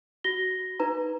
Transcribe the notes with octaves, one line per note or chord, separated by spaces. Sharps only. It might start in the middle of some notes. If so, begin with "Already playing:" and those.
F#4 A#6 G7
D#4 B4 A#5